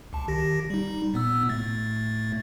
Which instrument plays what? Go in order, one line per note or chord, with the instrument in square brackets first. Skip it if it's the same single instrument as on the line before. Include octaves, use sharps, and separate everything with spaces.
[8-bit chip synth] C#2 A5
D#3 G4 A#6
G3 D#4
A#2 B3 E6
A2 A3 A6